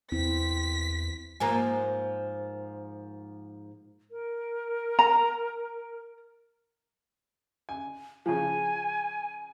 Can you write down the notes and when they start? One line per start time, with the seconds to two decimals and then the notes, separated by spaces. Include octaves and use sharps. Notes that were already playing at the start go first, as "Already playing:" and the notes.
0.12 E2 C4 E4 B6
1.40 G#2 F3 A#3 G#5 A#5
4.11 A#4
4.99 A#5
7.69 G#5
8.26 C#3 F3 G#5